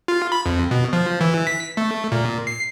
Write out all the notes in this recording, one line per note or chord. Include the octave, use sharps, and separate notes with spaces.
F4
B5
F2
B2
F3
E3
B6
A3
A#2
C7